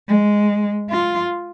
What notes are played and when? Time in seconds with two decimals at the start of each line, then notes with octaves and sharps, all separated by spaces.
0.08 G#3
0.91 F4